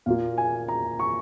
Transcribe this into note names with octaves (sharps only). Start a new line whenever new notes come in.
A#2 A#3 F4 F5
G#5
A#5
C#6